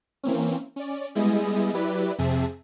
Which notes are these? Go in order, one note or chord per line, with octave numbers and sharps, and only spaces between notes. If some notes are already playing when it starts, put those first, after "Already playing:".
E3 A#3 C4 C#4
C#4 D5
G3 G#3 B3 E4 G#4 D#5
F#3 E4 G4 B4 D5
F2 C3 C4 G#4 E5 A5